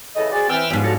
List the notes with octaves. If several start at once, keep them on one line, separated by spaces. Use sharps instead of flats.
C#3 E3 A4 D#5
F#4 G#4 C5 D5
E3 C4 G5 E6 F6
G#2 F3 G3 B3
F#4 A4 C#5